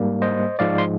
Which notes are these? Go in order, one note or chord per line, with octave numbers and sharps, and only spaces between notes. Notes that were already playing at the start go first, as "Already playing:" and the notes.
Already playing: G#2 G3 A#3
C5 D#5
G#2 F3 G#3 D5 F5
C6